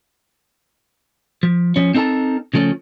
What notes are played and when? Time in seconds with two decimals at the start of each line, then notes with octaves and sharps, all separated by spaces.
1.43 F3
1.76 F3 C#4
1.94 C4 D#4 A4 A#4 A5
2.54 C#3 F3 A3 C#4